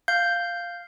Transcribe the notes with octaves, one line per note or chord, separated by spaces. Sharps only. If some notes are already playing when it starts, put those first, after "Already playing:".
F5 G6